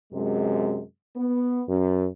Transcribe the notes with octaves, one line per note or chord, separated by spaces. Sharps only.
F#2 C3 G#3
B3
F#2